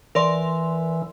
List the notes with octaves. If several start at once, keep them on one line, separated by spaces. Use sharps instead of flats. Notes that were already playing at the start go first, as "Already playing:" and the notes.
E3 A#4 D5 C6